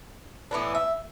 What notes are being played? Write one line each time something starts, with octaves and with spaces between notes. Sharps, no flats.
A2 E3 B3 D4
E5